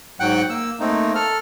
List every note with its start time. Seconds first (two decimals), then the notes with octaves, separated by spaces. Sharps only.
0.20 G#2 F#3 F#5 G5 F#6
0.50 A#3 E6
0.80 A3 A#3 C4 D#4
1.15 A4 F6